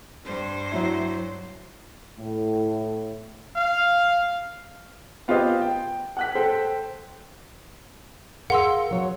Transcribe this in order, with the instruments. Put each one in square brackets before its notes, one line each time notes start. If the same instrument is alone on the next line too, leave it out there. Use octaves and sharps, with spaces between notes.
[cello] G2 C5
[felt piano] F#3 E4
[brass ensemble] A2
[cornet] F5
[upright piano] B3 F4 G4 C5 D#5
G5
F#5 F#6 B6
A4 C5 G5
[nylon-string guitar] G#4 A#4 F5 [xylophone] F#5 C6 E6
[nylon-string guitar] F#3 C#5